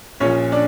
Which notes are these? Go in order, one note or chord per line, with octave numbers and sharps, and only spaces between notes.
A#1 A#2 F3 C#4 C#5
D4 D5